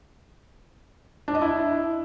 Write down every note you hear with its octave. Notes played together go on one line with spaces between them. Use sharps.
D4
D#5
E4